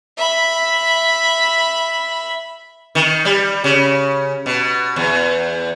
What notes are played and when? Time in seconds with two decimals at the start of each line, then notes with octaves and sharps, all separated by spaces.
0.17 E5 B5
2.95 D#3
3.25 G3
3.64 C#3
4.46 B2
4.96 E2